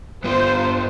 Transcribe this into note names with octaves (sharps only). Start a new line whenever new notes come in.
G2 B3 F4 C5